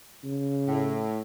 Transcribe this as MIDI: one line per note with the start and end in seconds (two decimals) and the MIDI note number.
0.24 1.10 49
0.68 1.21 45